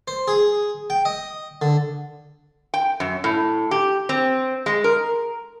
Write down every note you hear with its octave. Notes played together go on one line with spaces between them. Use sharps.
C5
G#4
G5
D#5
D3
G5
F#2
A2
G4
C4
G#3
A#4